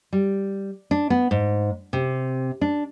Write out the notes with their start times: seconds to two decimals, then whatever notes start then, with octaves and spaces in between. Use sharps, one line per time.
0.13 G3
0.91 D4
1.10 B3
1.31 G#2
1.93 C3
2.61 D4